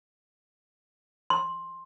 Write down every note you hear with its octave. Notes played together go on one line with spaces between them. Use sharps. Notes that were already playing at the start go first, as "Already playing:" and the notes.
C6